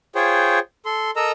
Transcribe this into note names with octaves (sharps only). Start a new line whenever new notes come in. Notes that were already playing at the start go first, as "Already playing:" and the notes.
F4 G#4 C5 C#5 G5
A4 C6
A4 A#4 D#5 A#5 E6